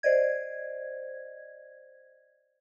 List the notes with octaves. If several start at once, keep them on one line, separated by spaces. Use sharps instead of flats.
C5 D5 D#5 G#6